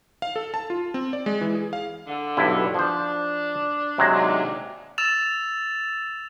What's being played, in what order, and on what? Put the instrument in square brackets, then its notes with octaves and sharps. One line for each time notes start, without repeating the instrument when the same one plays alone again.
[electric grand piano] F5
A4
A5
F4
C4
D5
G#3
E3
G#4
F5
[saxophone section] D3
[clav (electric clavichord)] B1 G2 E4
[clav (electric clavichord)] F3 C5 [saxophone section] D4
[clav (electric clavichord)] C3 F#3 G#3
[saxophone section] D#2 G#2 D4
[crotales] E6 A6 E7 F7